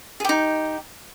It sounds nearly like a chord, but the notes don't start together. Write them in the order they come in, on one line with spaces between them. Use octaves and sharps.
G#4 G4 D#4